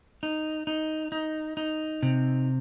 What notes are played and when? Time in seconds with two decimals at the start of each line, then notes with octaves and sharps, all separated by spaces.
0.23 D#4
0.67 D#4
1.12 D#4
1.57 D#4
2.03 C3